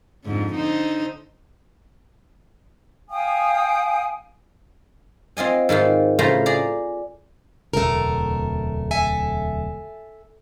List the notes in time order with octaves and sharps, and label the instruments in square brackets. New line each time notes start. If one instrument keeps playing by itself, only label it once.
[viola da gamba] F2 G#2 D3
D3 D#4 C5
[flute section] F5 G5 G#5 D#6
[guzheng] C4 F4 D#5 G#5
G#2 D#3 C4 F4
A2 C#3 A3 F4 C5 A#5
G#4 D5 A#5
[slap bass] D1 E2 B2 [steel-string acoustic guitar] A3 A#4
[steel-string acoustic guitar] A4 E5 G#5